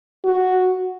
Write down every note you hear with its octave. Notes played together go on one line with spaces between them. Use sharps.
F#4